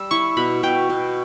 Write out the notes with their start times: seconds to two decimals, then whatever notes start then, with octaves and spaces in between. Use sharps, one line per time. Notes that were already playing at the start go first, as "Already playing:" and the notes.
Already playing: G3 E6
0.11 E4 C#6
0.37 B2 B5
0.63 B2 G5
0.90 B2